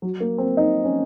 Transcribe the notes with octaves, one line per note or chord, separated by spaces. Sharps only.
F#3
A#3
C4
D#4
C#4